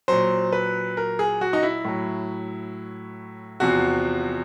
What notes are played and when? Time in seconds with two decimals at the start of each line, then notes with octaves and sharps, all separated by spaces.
0.08 A#2 F#3 C5
0.53 B4
0.97 A#4
1.19 G#4
1.41 F#4
1.53 D#4
1.63 E4
1.85 A2 F#3
3.60 E2 C3 F3 F#4